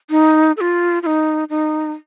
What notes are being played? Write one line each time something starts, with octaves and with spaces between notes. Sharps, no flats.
D#4
A4
F4
F4
D#4
D#4